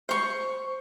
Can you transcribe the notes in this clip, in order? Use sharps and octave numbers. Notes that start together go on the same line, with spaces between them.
C5 C#6